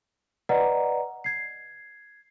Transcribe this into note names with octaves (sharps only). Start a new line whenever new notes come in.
B4 D5 D#5 F#5 A#5
G#6 C7